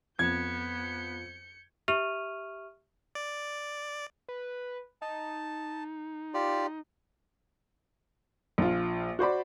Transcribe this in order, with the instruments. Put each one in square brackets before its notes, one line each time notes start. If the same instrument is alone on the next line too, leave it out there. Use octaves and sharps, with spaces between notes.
[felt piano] F2 [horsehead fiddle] B3 [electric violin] G6 C#7 [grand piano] G#6
[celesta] G4 E5 C#6 F6 D#7 F7
[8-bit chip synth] D5
[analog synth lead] B4
[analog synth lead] D#4 [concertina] A5
[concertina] F4 G4 D5
[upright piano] A#1 F4
F#4 C5 D5 B5